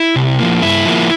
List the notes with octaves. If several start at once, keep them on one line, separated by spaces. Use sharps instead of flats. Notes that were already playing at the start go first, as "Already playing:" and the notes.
Already playing: E4
C3
F3 A#3
G2 E4
F3 A#3